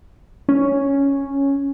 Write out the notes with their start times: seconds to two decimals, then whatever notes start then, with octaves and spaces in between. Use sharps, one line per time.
0.49 C#4